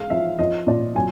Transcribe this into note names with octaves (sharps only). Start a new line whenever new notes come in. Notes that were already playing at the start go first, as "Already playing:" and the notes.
Already playing: G#3 F5
F3 E5
F3 D#5
A#2 D5
F#3 G#5